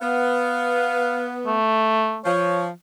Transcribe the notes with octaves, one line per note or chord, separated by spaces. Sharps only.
B3 F5
A3
F3 C#5